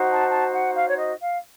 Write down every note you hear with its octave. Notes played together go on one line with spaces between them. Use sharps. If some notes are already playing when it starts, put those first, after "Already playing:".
Already playing: D#4 F#4 C5
A5
A5
F#5
F5
C#5
D#5
F5